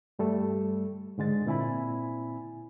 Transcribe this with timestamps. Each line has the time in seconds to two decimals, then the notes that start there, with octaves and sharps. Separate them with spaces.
0.19 G2 G3 A3 A4
1.18 G#2 D3 G#3 A6
1.46 A#2 C4 E4 G#5 B5